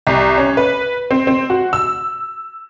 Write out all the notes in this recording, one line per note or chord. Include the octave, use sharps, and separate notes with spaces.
C2
C#4
B4
C4
C4
F#4
E6